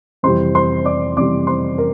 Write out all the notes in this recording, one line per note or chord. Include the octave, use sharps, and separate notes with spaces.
F2 C3 E3 G3 C5 C6
C5 C6
D5 D6
F2 C3 E3 G3 D5 D6
C5 C6
A#4